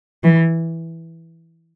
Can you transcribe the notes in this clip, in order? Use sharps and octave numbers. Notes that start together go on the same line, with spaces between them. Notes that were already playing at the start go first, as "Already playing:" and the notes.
E3